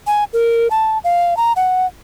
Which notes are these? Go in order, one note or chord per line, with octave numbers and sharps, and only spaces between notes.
G#5
A#4
A5
F5
A#5
F#5